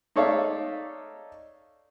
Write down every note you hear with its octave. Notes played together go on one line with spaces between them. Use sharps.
D#4 A4 C#5 D5 E5 F5